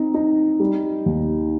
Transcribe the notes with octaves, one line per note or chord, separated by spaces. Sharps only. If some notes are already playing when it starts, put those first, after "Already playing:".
Already playing: C4 D#4
D#4
G3
D#2